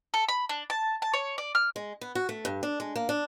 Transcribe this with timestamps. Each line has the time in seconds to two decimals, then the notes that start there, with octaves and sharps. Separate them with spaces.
0.14 A4
0.29 B5
0.49 D4
0.70 A5
1.02 A5
1.13 C#5
1.38 D5
1.55 F6
1.76 G#3
2.01 B3
2.15 F#4
2.29 A3
2.45 G2
2.63 D4
2.80 G#3
2.96 A#3
3.09 D4